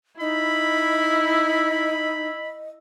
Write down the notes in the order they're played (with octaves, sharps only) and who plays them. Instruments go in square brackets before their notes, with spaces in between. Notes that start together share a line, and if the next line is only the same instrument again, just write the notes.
[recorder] D#4 [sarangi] E4 [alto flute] D#5 [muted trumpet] B5